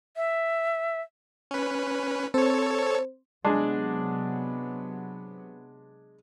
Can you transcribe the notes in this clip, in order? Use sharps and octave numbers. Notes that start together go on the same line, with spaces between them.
E5
C#4 B4
C4 A4 C5 C#5
C3 F#3 G#3 B3 D4 G#4